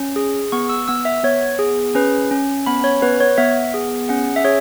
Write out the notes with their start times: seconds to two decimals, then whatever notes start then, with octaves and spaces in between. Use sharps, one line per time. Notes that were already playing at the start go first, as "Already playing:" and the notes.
Already playing: C#4
0.16 G#4
0.52 B3 C#6
0.69 E6
0.88 B3 E6
1.05 E5
1.24 B3 C#5
1.59 G#4
1.95 C#4 B4
2.31 C#4
2.66 B3 B5
2.84 C#5
3.02 B3 B4
3.20 C#5
3.38 B3 E5
3.74 G#4
4.09 C#4 F#5
4.36 E5
4.45 G#4 C#5